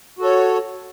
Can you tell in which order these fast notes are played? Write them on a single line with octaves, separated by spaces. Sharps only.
F#4 A4 C#5